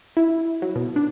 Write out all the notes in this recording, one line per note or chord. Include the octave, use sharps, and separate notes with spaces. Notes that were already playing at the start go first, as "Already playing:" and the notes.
E4
F#3
B2
D4